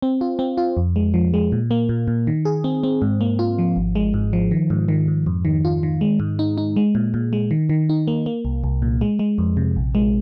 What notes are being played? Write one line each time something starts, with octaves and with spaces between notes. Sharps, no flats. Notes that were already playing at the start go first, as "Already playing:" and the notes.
C4
F4
C4
F4
F2
G#3
F3
G#3
A#2
A#3
A#2
A#2
D#3
G#4
C4
C4
G#2
A#3
F4
F3
G#1
G#3
G#2
F3
D#3
G#2
D#3
G#2
F2
D#3
F4
D#3
G#3
G#2
D#4
D#4
G#3
A#2
A#2
G#3
D#3
D#3
D#4
A#3
A#3
C2
C2
A#2
G#3
G#3
F2
C3
A#1
G#3